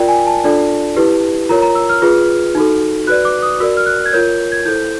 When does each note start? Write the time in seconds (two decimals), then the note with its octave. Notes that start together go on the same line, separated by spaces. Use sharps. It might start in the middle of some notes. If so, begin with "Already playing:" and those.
Already playing: F4 A#4 D5 G5
0.08 G#5
0.27 A5
0.44 D4 F4 A4 D5
0.97 E4 G4 B4
1.49 F4 A#4 C#5 A#5
1.62 A#5
1.75 E6
1.89 F6
2.02 F4 G#4 B4
2.55 D#4 F#4 A4
3.07 F#4 B4 D5 F#6
3.25 D6
3.42 D#6
3.60 F#4 A#4 D5 E6
3.77 F6
3.86 F#6
4.06 G#6
4.13 F4 A#4 C#5 G6
4.52 G#6
4.65 E4 A4 C5 G6